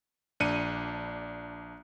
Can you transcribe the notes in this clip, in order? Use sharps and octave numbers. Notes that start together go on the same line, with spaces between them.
A#1 D4 C#7 D#7